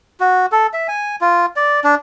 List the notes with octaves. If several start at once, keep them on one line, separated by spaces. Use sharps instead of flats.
F#4
A4
E5
G#5
F4
D5
D4